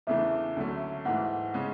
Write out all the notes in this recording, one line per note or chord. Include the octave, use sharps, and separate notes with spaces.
E2 C#3 E3 A3 D4 E5
D2 D3 F#3 A3 C#4
G#2 E3 A3 F#5
C#3 G#3 C#4